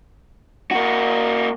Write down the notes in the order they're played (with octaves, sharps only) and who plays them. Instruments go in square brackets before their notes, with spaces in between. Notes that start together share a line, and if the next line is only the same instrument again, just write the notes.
[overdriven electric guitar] A#3 F#4